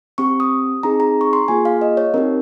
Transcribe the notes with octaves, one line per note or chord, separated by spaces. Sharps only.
C4 G4 C#6
D#6
C4 D#4 G#4 A#5
A#5
C#6
C6
A#3 F4 G#4 G#5
F5
D#5
C#5
C4 D#4 G4 A#4